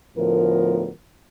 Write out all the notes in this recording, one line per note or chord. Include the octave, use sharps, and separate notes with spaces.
D2 A2 F3 B3 A#4